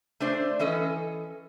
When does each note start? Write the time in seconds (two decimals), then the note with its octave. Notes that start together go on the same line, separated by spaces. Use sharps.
0.20 A3 D4 C5 D5
0.59 E3 C#4 A4 D#5